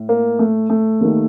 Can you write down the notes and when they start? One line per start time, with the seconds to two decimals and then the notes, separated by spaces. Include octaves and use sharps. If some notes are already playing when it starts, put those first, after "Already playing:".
Already playing: A2
0.09 A#3
0.39 A3
0.70 A3
1.01 D#2 D#3